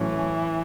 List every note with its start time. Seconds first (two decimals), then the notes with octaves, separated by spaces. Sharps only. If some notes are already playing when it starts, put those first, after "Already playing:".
Already playing: A2 E3 F#3 A3 C#4